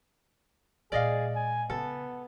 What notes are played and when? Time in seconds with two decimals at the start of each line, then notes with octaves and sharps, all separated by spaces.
0.92 A#2 G#3 G#4 D5 D#5 F5
1.35 G#5
1.70 C#3 B3 A4